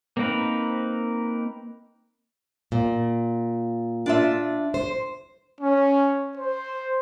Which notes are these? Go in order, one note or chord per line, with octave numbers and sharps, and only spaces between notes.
A#3 C4 D#4 A#4 B4
A#2
D4 F4 E5
C5
C#4
C5